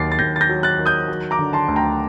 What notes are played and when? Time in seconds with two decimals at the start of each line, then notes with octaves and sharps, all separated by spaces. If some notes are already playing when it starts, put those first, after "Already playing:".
Already playing: D#2 D#3 F#3 D6 A6 C7
0.12 A6
0.19 D#2 G6 A#6
0.36 A6
0.41 G6 A#6
0.49 F#3
0.63 F#6 A6
0.79 D#3
0.86 D#6 G6
1.08 F#3
1.31 A#5 D6
1.39 D3
1.53 A5 C6
1.68 D2
1.76 G5 A#5